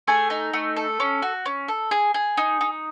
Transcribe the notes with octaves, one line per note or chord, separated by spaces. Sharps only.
A3 G#4 G#5
D#4
A3
A4
C#4
F#4
C#4
A4
G#4
G#4
D#4
D#4